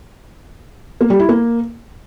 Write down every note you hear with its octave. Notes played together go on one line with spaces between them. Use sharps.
A#3
G3
E4
A#3